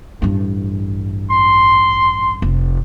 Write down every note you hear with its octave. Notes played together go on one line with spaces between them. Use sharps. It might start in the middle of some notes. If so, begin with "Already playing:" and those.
A1 G2
C6
F1